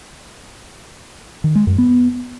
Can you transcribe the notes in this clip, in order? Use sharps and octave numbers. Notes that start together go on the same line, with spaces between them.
D#3
G#3
F#2
B3